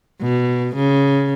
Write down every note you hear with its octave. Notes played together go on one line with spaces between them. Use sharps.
B2
C#3